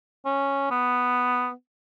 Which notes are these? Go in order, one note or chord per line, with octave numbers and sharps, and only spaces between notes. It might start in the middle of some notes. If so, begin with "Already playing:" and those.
C#4
B3